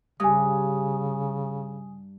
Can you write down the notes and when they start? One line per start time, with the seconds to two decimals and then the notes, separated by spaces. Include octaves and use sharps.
0.20 G2 C#3 G#5 D#6